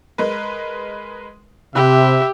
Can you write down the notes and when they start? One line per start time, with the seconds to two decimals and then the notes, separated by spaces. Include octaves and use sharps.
0.18 G#3 A#4 B4
1.75 C3 G4 E5 B5 E6 F#6